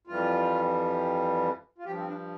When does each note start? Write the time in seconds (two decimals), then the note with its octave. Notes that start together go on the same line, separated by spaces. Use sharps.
0.07 F2 E3 G3 F4
1.78 F4
1.85 G2 F3 G4
1.97 C4
2.07 D4